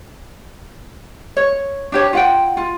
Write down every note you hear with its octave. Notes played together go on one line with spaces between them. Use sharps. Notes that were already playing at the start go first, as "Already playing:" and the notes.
C#5
D4 G4 C#5
F4 F#5 G5
F4